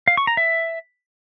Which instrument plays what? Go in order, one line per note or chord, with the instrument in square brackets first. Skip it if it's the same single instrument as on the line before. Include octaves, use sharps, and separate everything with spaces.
[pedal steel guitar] F5
C#6
A#5
E5